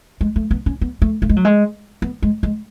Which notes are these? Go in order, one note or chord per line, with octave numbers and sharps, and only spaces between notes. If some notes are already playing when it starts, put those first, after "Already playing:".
G#3
A3
B3
C#4
B3
A3
A3
G#3
F#3
G#3
B3
G#3
G#3